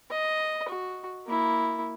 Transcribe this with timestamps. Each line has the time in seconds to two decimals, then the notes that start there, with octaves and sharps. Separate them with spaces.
0.10 D#5
0.68 F#4
1.27 A#3 E4